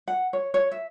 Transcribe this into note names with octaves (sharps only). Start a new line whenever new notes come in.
F#5
C#5
C#5
E5